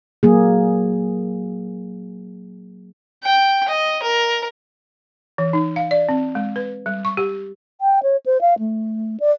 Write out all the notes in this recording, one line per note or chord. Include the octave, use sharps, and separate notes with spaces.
F#3 A#3 G#4
G5
D#5
A#4
E3
D#4
F5
D5
C4
G#3
B4
G3
C#6
G4
G5
C#5
C5
F5
A3
D5